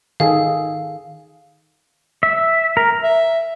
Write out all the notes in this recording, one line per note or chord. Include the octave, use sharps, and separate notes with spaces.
D#3 G#4 A4 F5
E5
A#4
E5